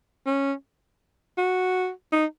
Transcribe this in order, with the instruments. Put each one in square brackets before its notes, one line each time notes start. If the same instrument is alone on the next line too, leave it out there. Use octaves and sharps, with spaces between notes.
[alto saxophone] C#4
F#4
D#4